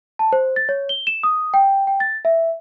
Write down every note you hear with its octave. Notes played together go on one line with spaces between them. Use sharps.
A5
C5
A6
C#5
G7
E7
D#6
G5
G5
A6
E5